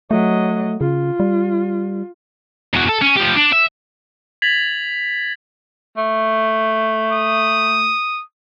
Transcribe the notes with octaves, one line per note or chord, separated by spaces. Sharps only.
F#3 A3 D#5
C#3 F4
G3
E2 F#4
A4
C#4
F3 G4
D4
E5
G#6 A6 B6 F7 F#7
A3
D#6